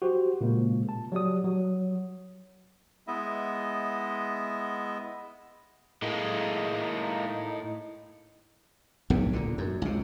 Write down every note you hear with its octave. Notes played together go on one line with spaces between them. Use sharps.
F#4 G4 C5
A#2 C#3 G#3 A#3
A5
F#3 G4 D5 D#6
F#3
G#3 B3 E4 D#5 E5
A2 G#3 A#3 D#4
D1 B1 E2 C3
A#2 D3
F#2
C#2 C3